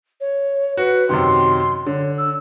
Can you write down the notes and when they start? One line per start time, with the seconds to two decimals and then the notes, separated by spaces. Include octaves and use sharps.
0.21 C#5
0.77 F#4 B4
1.09 F#2 C3 D#3 C6
1.86 D3 C#5
2.18 E6